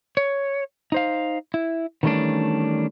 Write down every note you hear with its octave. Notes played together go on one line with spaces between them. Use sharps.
C#5
D#4 C5 F5
E4
D#3 E3 G3 A3 C#4 D4